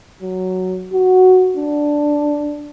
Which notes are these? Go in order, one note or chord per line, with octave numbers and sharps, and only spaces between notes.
F#3
F#4
D4